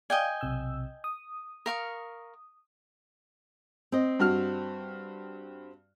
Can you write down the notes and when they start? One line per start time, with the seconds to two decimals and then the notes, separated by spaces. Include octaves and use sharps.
0.10 D5 D#5 F5 G5 G#5
0.41 B1 C3 E6
1.04 D#6
1.66 A#4 F5 C#6
3.92 C4 D#5
4.19 G2 F#4 F6